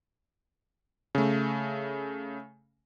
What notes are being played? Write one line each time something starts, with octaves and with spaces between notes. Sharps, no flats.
C#3 A3